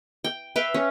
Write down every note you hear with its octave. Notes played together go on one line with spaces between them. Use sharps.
G5
B4 E5 F5 G5
C#4